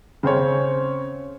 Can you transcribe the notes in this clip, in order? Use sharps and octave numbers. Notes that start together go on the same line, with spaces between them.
C#3 C4 C5 C#5